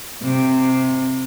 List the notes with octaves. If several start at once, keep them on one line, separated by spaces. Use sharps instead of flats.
C3